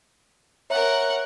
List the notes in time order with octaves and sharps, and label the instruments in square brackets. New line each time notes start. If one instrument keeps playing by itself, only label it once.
[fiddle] A#4 F#5 [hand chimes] C#5 E5 A#5